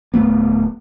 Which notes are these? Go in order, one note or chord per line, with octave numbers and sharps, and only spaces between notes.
D1 F2 A3 B3